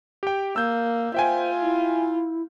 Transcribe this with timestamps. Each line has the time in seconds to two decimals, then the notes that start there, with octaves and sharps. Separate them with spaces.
0.23 G4 G5
0.56 A#3 E6 G6
1.14 F4 C5 E5 G5 G#5
1.62 E4